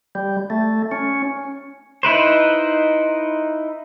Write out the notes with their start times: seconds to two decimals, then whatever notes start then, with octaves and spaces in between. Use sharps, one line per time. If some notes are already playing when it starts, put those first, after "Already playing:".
0.15 G3
0.50 A3
0.92 C#4
2.03 D#4 E4 B4 C5